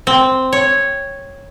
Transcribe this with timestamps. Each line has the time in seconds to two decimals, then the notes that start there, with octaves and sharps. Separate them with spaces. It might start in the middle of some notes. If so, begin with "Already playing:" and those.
0.07 C4
0.52 C#5